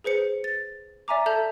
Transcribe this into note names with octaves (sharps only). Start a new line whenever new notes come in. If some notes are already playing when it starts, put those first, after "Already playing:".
G#4 B4 C5 C#7
A6
D5 E5 G#5 A#5 D6
A4 E5 A5 G6 F7